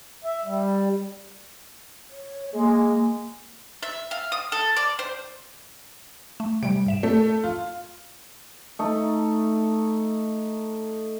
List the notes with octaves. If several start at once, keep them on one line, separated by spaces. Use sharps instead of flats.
E5
G3
C#5
G#3 A#3
E5
F5
D#6
A4
D5
C5
A3
C3 G3 D7
G#2 E5 E7
A3
F4
A3 D#4